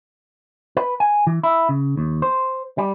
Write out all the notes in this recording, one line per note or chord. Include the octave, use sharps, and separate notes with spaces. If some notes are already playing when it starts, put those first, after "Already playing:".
B4
G#5
E3
E4
C#3
D#2
C5
G3